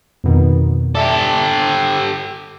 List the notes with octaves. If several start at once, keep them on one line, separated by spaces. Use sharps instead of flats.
F2 B2 D#3
G4 A4 D5 E5 A5